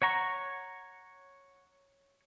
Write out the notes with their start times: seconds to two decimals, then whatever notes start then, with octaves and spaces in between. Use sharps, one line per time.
0.02 C#5 F#5 A#5 C#6